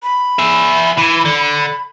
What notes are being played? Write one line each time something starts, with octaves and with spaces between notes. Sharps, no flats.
B5
G#4 E5
E3
D3